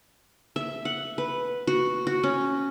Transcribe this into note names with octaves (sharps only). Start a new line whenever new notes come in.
E5
F#5
B4
F#4
F#4
C#4